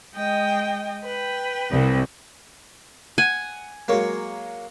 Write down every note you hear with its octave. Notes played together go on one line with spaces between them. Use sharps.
G#3 D#5 G5
B4 G5
C2
F#5 G#5
F#3 G#3 A#3 C#5